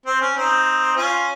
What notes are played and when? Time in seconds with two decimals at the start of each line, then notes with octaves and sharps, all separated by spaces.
0.06 C4
0.21 C#4
0.36 C4 D#4
0.96 C#4 F4